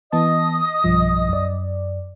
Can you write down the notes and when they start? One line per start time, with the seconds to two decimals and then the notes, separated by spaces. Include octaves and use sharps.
0.12 E3 B3 D#5 A5 D#6
0.84 B1 G2 F3
1.29 F#2 D5